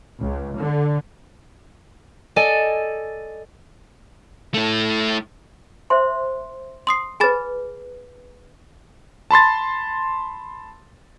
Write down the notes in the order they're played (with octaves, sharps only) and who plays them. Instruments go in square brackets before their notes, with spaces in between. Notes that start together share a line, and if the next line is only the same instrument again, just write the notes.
[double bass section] C#2
D3
[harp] A4 D5 D#5 G#5 A5
[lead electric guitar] A3 E4
[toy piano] C5 E5 C6
[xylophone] C6 D#6 C7
[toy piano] G#4 B4 [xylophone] G#5 B5 A6
[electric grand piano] A5 B5 C6 A6